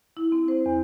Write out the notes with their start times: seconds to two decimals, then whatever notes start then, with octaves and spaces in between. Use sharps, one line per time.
0.17 E4
0.32 C4
0.48 C5
0.66 E2